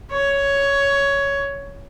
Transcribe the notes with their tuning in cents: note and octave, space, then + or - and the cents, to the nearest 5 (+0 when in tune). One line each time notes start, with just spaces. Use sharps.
C#5 +10